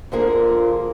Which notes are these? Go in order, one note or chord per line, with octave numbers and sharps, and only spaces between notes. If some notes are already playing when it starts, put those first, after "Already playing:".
D3 F3 A#3 F4 G#4